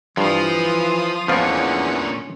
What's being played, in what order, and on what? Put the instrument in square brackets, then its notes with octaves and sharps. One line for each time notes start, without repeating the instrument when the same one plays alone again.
[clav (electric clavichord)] G2 [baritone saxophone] E3 [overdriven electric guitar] F3 [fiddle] F4 D#6
[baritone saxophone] E2 [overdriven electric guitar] A#2 D3 [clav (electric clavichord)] F3 B3 F4 [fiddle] C#4